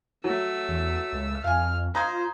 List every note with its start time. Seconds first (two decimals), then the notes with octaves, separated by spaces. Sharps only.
0.24 F#3 A3 E6
0.69 E2
1.13 C#2
1.44 F2 F5 G#5 F6
1.95 F4 C5 A#5 D#6 G#6